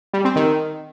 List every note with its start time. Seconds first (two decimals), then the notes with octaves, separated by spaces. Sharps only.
0.13 G3
0.25 C4
0.36 D#3